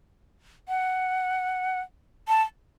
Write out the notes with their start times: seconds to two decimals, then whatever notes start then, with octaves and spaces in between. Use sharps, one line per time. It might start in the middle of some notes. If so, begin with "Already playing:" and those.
0.68 F#5
2.28 A5